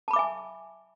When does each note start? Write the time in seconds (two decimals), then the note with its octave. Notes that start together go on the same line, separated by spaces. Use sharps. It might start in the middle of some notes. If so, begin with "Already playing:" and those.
0.08 A5
0.11 B5
0.13 D6
0.16 E5
0.19 G#5